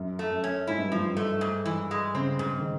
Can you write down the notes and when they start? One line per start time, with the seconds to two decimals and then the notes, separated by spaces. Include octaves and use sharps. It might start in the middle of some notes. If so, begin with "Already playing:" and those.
Already playing: F#2
0.19 A3
0.31 F#2
0.44 C#4
0.67 G#2 E4
0.78 G2
0.89 F#2 F3
0.99 G2
1.17 A3
1.41 G#2
1.66 E3
1.91 G#3
2.15 C#3 C4
2.39 G#2 C#3
2.60 D#3